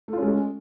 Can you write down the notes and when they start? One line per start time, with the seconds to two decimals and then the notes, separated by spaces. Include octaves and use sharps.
0.08 A3
0.13 F4
0.18 C#4
0.22 G#3